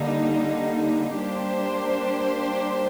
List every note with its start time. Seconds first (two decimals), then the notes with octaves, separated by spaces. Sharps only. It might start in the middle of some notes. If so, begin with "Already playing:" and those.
Already playing: D3 G3 A#3 D#4
1.18 G3 A#3 D4 G4 C5